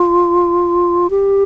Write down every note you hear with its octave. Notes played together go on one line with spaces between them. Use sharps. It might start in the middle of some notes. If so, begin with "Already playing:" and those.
Already playing: F4
G4